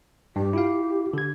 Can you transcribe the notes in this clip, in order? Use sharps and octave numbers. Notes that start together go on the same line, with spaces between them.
G2 G4
E4 F4 F5
D3 G#6